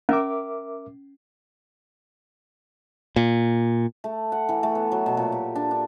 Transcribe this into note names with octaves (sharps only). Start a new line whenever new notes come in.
C#4 A#4 E5 D6
A#2
A3
F#5
E3
A3
B3
F#3
B2
A#2
G4
D4
D4